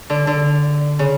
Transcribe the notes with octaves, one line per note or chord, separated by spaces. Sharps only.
D3
D3
C#3